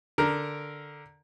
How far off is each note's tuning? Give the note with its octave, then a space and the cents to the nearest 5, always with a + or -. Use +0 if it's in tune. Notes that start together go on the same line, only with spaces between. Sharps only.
D3 +0 A#4 +0